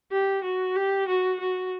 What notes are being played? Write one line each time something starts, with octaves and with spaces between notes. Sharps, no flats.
G4
F#4
G4
F#4
F#4